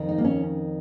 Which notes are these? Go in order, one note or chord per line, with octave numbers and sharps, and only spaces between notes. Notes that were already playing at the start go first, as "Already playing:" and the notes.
Already playing: F2 D#3
D#4
A#3
C#4